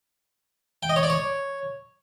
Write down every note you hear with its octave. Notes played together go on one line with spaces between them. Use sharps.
G5
D#5
C#5
D5
C#5